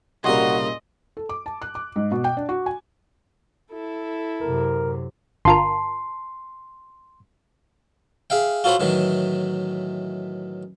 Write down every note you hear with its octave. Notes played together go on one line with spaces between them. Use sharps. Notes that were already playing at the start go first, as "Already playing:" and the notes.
C2 A#2 C#3 F#4 G4 A#4 D#5 C6
A4
D6
A5
F#6
D6
G#2
B2
G5
D4
F#4
G#5
E4 A4
F#2 C3 A#4
G1 F4 A#4 A5 C6
G#4 E5 F5 G5
F4 F#4 A4 C5 C#5 B5
A2 D#3 E3 F#3